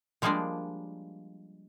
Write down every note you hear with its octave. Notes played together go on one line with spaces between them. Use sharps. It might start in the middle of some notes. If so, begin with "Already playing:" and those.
F3 G3 G#3 A#3 D4 D5